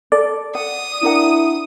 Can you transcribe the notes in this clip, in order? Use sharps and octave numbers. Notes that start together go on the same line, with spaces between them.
A4 D5
F#5 D#6
D4 E4 A#4 F#5